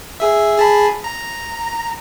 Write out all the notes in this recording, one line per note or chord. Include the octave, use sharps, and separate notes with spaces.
G#4 E5
G#4 A5 B5
A#5